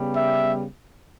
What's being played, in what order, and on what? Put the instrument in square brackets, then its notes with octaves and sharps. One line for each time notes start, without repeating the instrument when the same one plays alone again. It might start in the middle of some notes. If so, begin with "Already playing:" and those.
Already playing: [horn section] C#3 G3 B3
E5